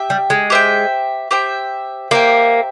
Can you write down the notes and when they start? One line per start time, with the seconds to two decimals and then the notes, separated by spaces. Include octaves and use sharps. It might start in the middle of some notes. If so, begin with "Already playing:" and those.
Already playing: G4 E5 G5
0.10 G3
0.30 G#3
0.50 G4 C5 E5 G5
1.31 G4 C5 E5 G5
2.11 A#3 G4 C5 E5 G5